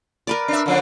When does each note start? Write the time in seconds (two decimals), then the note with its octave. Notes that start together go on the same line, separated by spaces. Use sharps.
0.27 A#4 B4 D5
0.48 D4 E5
0.66 D3 F3 D4